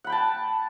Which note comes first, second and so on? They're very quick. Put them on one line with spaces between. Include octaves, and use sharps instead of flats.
F#5 B5 G5 A5